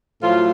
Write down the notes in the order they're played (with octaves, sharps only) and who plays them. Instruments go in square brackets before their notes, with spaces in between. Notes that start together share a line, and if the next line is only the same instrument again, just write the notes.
[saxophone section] A2 F3 F#3 A3 F4